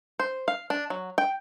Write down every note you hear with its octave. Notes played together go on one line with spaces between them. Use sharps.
C5
F5
D4
F#3
G5